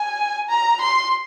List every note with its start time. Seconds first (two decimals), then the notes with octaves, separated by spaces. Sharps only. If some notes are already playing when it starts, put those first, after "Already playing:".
Already playing: G#5
0.49 A#5
0.81 C6